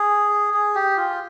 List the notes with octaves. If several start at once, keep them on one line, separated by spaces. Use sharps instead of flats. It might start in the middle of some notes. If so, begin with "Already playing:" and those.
Already playing: G#4
G#4
G4
F4